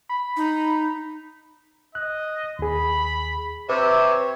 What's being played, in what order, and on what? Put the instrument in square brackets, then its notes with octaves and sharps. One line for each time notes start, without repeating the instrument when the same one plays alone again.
[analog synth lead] B5
[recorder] D#4
[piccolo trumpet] D#5 [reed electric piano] F#6
[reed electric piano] D#2 G#4 [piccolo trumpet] B5
[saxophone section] C3 E5 [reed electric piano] B4 [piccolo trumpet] C#5